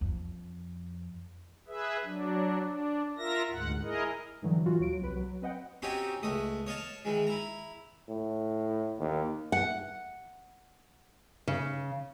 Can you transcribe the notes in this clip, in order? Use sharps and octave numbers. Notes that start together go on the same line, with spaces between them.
F2
G#4 B4 E5
F#3 D4
D4
F4 A#4 E5 A#6
D2 G#2 F#5
E4 G#4 A#4 D#5
G#2 D3 E3 F#3 G3
A#2 E3 F4 F#4
D#2 F#3 F#4 D7
C2 B4
F#3
C4 B4 D#5 F#5 G5
C4 C#4 D#4 F#4 G4 G#5
C#2 A3 D#5 D#6
C#5 D#5 F5 A5
D#3 E3 G#3
E4 A#5
A2
D#2
F#5
C#3